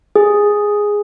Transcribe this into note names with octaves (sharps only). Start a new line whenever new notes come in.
G#4